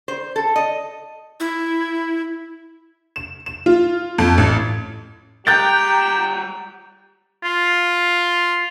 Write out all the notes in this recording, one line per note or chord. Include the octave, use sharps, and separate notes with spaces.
C5
A4
D#5
E4
E7
E7
F4
F2
A1
G3 G4 G5 A#5 F#6 G6 A6
F4